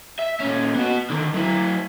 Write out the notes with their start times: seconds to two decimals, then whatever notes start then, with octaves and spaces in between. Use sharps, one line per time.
0.19 E5
0.40 A#2 C#4
0.75 B3 F#4
1.10 D3 D#3
1.34 F#3 E4